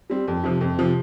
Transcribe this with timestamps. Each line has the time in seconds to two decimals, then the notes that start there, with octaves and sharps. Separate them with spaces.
0.10 G3 C4
0.28 F2
0.44 C3 F3
0.61 F2
0.78 C3 F3